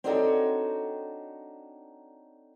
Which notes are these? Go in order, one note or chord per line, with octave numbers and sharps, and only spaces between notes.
C4 D4 D#4 F#4 A4 C#5